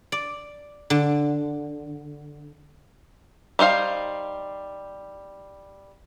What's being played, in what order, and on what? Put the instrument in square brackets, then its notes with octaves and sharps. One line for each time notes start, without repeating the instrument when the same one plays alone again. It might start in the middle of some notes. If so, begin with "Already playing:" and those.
[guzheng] D5
D3
[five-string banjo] G3 D#4 C5 F5